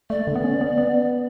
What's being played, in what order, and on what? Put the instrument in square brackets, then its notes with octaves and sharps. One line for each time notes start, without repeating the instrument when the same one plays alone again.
[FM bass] A3 [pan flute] D5
[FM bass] D3
B3
C#4
B3
B3